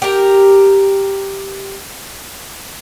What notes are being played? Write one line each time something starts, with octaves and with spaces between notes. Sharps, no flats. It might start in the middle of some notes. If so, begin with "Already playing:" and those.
G4 A#4